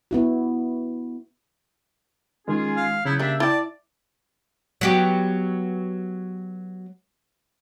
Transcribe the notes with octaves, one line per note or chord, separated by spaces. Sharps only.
B3 E4 F#4
D#3 G#3 C#4 F4 G#4
F5
C#3 F#3 B3 E4 G6 G#6
G3 A#3 D4 E5
E4 D5 G5 A5
F#3 B3 G4